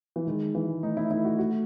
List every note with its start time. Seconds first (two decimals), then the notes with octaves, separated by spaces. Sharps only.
0.16 E3
0.27 D#3 G#3
0.55 E3
0.83 A3 D#4
0.97 E4
1.11 E4
1.25 F#4
1.39 F#4